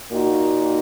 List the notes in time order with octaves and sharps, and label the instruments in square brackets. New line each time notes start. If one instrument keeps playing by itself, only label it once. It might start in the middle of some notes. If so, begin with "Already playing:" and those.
[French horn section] A#2 A#3 D#4 F#4